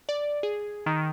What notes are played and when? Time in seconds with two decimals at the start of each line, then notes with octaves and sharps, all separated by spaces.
0.09 D5
0.43 G#4
0.86 D#3